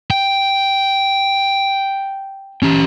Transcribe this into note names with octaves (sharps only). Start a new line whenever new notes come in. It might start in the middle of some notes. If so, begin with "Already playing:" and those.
G5
C#4 G4